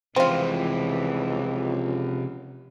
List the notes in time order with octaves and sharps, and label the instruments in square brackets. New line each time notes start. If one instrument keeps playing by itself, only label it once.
[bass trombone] C#2 [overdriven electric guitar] C3 F3 [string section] E3 [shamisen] C4 F4